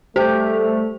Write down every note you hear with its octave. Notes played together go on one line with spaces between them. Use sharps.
G3 A3 G4 C5